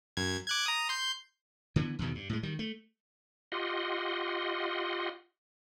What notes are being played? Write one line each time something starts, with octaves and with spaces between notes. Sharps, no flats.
F#2 G#6
D6 F#6 G#6
A#5 D#6
C6 G6
D3 E3 G#3 B3
E2 G2 B2 D#3
G2
A2 G#3
D#3 G3
A3
F4 G4 D#5 F#5 C6